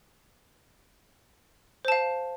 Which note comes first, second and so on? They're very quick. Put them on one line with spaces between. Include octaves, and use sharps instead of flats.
C5 A5 F5